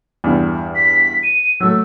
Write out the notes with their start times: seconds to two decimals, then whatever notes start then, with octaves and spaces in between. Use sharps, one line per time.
0.24 E2 G2
0.75 B6
1.23 D#7
1.60 F#3 A3 E6